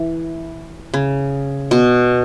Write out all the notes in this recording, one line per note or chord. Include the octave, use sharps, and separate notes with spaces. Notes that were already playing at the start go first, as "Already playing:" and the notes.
Already playing: E3
C#3
B2